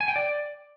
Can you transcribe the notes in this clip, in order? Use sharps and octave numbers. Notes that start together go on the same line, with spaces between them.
G#5
G5
D5